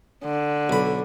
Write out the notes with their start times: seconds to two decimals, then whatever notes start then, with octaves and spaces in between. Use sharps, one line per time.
0.25 D3
0.70 B1 B5